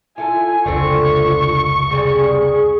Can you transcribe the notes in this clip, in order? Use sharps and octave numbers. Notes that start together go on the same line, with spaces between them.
E4 F4 A4 G#5
F1 C#2 D3 A3 C4 F4 C#6
C3 G3 G#4